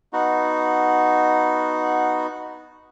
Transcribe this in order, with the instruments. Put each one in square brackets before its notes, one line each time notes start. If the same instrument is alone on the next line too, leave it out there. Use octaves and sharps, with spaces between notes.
[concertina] B3 D#4 F#4